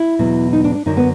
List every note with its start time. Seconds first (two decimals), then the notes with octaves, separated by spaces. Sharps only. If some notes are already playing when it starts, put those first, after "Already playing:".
Already playing: E4
0.19 E2 B2 F#3
0.53 D#4
0.64 D4
0.75 D4
0.86 F#2 D3 F#3 D#4
0.97 B3